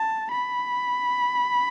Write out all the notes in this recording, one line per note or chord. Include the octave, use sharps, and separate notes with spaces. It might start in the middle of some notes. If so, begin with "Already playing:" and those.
Already playing: A5
B5